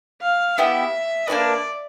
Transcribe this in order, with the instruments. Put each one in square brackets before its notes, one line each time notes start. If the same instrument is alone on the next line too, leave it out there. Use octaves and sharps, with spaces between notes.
[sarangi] F5
[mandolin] B3 E4 G4 [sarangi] E5
[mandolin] A#3 D4 F#4 B4 [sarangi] D5